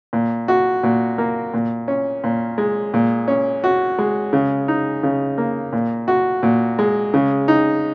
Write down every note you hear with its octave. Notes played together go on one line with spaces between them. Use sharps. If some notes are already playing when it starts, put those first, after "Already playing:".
A#2
F#4
A#2
A#3
A#2
C#4
A#2
G#3
A#2
C#4
F#4
G#3
C#3
D#4
C#3
A#3
A#2
F#4
A#2
G#3
C#3
D#4